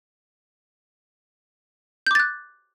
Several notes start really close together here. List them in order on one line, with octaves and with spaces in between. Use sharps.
G6 D6 A6 F#6